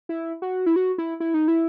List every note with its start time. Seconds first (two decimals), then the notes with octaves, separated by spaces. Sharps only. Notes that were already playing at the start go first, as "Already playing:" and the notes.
0.09 E4
0.42 F#4
0.66 E4
0.76 F#4
0.98 E4
1.20 E4
1.34 D#4
1.48 E4